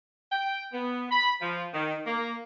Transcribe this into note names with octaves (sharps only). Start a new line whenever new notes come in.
G5
B3
B5
F3
D#3
A#3